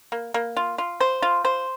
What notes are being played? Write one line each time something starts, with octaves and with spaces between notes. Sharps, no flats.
A#3
A#3
F4
F4
C5
F4
C5